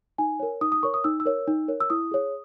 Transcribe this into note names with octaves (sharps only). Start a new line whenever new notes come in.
D#4 G#5
A#4 C#5
D#4 D#6
D#6
A#4 C#5 C#6
D#6
D#4 E6
E6
A#4 C#5
D#4
A#4 C#5
E6
E4 D#6
G#4 C#5